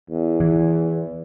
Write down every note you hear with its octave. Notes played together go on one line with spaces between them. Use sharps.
E2
E3